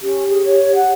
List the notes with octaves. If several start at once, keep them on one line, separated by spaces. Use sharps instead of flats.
C#4 G4
G#4
C#5
F#5